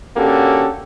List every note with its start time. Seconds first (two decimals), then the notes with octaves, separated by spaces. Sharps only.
0.17 D3 A#3 C#4 F#4 G4 A4